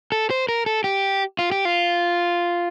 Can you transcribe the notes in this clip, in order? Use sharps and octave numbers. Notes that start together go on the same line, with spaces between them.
A4
C5
A#4
A4
G4
F4
G4
F4